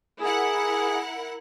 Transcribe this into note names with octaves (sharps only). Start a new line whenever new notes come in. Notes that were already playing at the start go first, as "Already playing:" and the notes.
E4 G#4 A#4 F#5